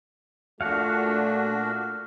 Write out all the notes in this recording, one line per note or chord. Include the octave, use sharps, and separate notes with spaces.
A#2 A3 D4 F#4 F5 F#5